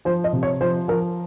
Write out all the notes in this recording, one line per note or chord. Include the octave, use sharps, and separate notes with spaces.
F3 C5
D#5
C3
C#5
F3 C5
F3 A#4